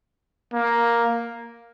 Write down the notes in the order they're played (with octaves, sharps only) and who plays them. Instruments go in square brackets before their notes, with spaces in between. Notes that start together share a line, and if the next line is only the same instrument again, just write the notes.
[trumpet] A#3